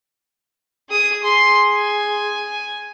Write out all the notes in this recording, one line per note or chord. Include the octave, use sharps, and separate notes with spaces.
G#4 D#6
G#4 C6
G#5